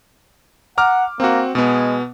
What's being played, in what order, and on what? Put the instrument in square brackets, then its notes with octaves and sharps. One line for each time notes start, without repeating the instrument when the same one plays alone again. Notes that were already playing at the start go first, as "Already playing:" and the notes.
[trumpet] F#5 [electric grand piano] A#5 D6 F6
[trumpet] A#3 [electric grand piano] C4 F#4
[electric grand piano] B2 B3 [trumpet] G#3